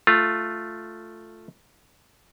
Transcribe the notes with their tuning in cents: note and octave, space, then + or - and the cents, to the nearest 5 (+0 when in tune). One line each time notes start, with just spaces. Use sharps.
A3 +0 F4 +0